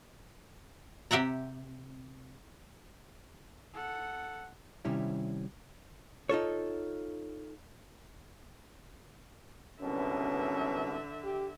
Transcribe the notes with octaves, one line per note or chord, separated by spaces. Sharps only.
C3 G4 E5 F#5 A#5
A4 F#5
C3 D#3 G3 C#4 E4
D#4 F4 A4 C#5
C2 F#2 B2 D3 C#4 B4 E5
G4